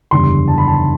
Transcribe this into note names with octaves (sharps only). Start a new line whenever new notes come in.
F#1 E2 D3 G3 C6
A5
B5
A5